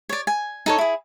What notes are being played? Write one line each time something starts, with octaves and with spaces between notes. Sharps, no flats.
C#5 D5
G#5
D#4 A4 C#5
E4 G#4